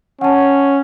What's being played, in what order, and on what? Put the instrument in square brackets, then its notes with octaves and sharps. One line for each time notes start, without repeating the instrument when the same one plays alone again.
[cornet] C#4 [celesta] F#5 A5